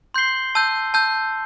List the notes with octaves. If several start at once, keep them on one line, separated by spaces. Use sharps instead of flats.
C6 G6 C7 G7
A5 E6 G6
A5 E6 G6